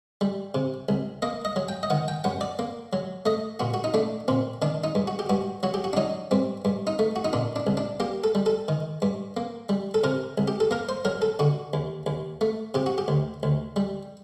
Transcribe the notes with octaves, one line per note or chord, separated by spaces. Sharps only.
G3
C3
C2
A#3 D#5
D#5
F#3
G5
D#5
D#3 F#5
G5
F#2 F#5
D5
A#3
F#3
A3 D#5
A#2 F#4
F#4
D#4
A3 D4
A#2 C4
D#3 D4
D#4
G2
F#4
G4
G2 F#4
F#3 F#4
G4
F#4
D4
F#3 D#4
G2 C4
G2
D#4
A3
F#4
D#4
A#2 D4
D4
C2
D4
A#3 G4
A4
G3
A4
D#3
G2
A#3
G3
A4
C3 A#4
C2
G4
A4
A#3 A#4
C5
F#3 A#4
A4
D3 F#4
D#2
D#2
A3
C3 G4
F#4
G4
D2
D2
G3